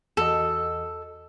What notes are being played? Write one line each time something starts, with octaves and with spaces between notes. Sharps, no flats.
E2 F#4 A4 D#5